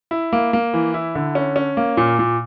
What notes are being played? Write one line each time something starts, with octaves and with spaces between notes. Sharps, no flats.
E4
A#3
A#3
E3
E4
D3
C#4
C#4
A#3
A#2
A#2